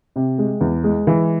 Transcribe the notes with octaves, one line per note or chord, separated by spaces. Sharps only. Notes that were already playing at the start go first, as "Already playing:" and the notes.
C3
G#3
E2
G#3
E3